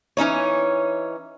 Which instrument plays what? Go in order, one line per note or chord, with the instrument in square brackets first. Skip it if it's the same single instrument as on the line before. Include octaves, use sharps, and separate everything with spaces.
[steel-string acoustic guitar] E3 C#4 D#4 C#5